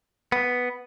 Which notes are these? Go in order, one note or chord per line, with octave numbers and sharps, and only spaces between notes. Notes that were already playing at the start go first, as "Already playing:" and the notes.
B3